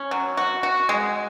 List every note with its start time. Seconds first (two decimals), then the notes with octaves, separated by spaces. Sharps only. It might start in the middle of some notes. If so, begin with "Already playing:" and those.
Already playing: C#4
0.11 F#3
0.37 F#4
0.63 F#4
0.89 G#3